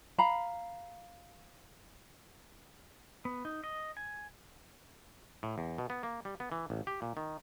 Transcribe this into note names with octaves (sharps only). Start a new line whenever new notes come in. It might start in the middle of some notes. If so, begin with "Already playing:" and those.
F5 A#5 B5
B3
D#4
D#5
G#5
A2
E2
B2
B3
A#3
G3
B3
E3
A1
G4
A#2
D#3